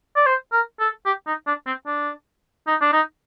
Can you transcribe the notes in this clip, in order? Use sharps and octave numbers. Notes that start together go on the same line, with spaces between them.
D5
C5
A#4
A4
G4
D#4
D4
C4
D4
D#4
D4
D#4